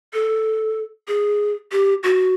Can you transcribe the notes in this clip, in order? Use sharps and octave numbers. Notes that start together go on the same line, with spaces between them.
A4
G#4
G4
F#4